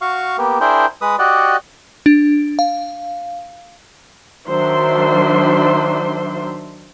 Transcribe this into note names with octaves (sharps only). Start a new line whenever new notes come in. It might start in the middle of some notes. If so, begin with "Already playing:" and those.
F#4 F5 C#6
A#3 B3 G4
D4 E4 G#4 A#4 C5 G5
G#3 B4 D#6
F#4 G4 D5 D#5 F#5
D4
F5
D#3 F#3 D4 C5 E5 C6